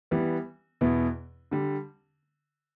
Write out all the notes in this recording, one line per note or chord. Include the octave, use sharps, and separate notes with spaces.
E3 G3 B3
E2 B2 B3 E4
D3 G3